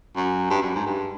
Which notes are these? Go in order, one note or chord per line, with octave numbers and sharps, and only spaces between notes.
F#2
G2
F#2
G#2
G2